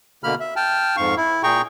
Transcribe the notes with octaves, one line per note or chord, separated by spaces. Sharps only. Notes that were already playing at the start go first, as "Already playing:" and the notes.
B2 D3 A#3 B5 F6
E5
G5 A5 F6
F2 G#2 F5 C#6
E4
A#2 G#4 G5 A#5 C#6